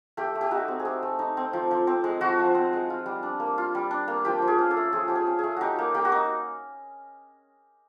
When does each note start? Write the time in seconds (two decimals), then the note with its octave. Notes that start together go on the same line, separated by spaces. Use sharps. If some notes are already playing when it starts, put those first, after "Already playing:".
0.17 A3 G4
0.35 A3
0.41 G4
0.51 D#4 F#4
0.68 C4
0.79 G#4
0.85 A3 G4
1.03 A3
1.19 D#4
1.37 C4
1.53 F3
1.71 F3
1.87 C4
2.04 G#3
2.21 F3 F#4
2.39 F3
2.55 C4
2.73 G#3
2.90 F4
3.06 G3
3.23 D4
3.40 A#3
3.58 F4
3.75 G3
3.91 D4
4.08 A#3
4.25 F3 G4
4.42 F3
4.47 G#4
4.59 C#4
4.71 A4
4.77 A3
4.93 F3 G#4
5.08 F3 G4
5.15 G#4
5.27 C#4
5.39 A3 G#4
5.57 D#4 F#4 G4
5.79 A#3
5.94 A#3 G4
6.05 F#4
6.12 D#4